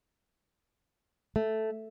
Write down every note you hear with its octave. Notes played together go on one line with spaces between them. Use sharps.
A3